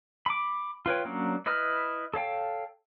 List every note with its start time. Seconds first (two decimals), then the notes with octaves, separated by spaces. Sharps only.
0.26 B5 D6
0.86 F4 B4 C#5 G5
1.05 F#3 A#3 C#4 D4
1.46 E4 B4 D#5 B5 F6
2.14 A4 C#5 F5 G5